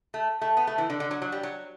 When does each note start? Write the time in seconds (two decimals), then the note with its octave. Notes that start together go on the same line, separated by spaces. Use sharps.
0.14 A3
0.41 A3
0.57 B3
0.67 A3
0.78 E3
0.90 D3
1.00 D3
1.11 F#3
1.22 F#3
1.32 G3
1.43 F#3